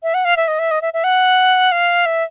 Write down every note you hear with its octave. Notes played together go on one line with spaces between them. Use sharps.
E5
F#5
F5
E5
D#5
E5
D#5
E5
E5
F#5
F5
E5